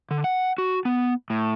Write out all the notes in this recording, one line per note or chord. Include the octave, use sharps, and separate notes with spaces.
D3
F#5
F#4
B3
A2